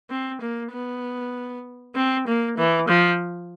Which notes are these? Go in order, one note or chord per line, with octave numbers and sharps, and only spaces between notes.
C4
A#3
B3
C4
A#3
E3
F3